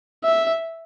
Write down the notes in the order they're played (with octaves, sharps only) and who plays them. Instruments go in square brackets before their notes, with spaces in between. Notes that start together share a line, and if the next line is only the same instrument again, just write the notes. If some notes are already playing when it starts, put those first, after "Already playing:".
[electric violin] E5